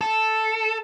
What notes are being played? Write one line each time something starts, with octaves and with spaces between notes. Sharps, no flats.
A4